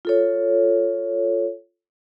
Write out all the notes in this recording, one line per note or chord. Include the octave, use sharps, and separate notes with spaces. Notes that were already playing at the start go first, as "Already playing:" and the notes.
F4 A4 C#5